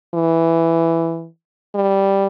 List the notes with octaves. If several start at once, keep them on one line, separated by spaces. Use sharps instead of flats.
E3
G3